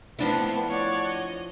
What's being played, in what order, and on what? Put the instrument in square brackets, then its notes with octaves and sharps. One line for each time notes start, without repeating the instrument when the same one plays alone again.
[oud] F3 D4 E4 [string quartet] A3 B3 C4
[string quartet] C#5 D5 F#5
D#5